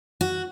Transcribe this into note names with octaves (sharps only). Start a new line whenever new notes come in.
F#4